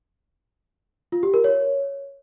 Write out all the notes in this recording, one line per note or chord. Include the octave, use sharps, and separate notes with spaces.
F4
G4
A#4
C#5